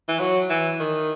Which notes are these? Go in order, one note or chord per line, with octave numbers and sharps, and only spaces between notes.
E3
F#3
E3
D#3